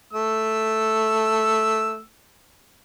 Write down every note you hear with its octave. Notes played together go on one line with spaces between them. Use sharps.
A3 E6